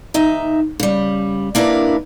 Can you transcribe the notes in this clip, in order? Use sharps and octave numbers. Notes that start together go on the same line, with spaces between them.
D#2 D#4 E5
C#3 G3
A#3 D4 E4 A#4 B4